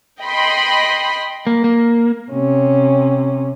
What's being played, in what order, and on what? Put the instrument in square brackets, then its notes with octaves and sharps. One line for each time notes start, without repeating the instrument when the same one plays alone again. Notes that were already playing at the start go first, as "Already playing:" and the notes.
[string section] D#5 G5 B5 C6
[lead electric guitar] A#3
A#3
[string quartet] C3 C#4